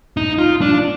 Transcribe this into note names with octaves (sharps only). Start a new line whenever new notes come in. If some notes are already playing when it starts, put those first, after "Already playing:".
D#4
F4
D4